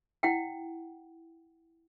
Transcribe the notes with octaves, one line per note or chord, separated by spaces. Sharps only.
E4 F#5 G5